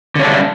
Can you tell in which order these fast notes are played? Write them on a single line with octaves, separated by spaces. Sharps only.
D3 C#4 D4 G3